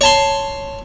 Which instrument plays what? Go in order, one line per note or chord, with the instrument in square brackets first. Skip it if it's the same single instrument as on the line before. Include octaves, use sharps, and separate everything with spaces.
[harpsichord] C#5 A5 C6